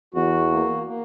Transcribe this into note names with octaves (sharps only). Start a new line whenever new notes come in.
E2 F#4
A#3
A#3